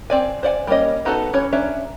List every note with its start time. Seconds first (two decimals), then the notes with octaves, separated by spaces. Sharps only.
0.10 C4 D5 G#5
0.43 C5 D5 F#5 G#5
0.67 G3 A#3 C#4 D#5
1.05 B3 D#4 F#4 A4 A5
1.33 E3 C#4 C#5
1.53 C#4 D4 E5 A#5